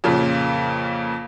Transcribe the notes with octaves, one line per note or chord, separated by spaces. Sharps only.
F2 A#2 C#3